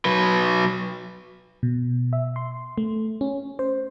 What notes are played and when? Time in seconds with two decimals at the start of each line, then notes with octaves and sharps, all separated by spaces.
0.05 F#3 B4
1.63 B2
2.13 E5
2.36 C6
2.78 A3
3.21 C#4
3.59 C5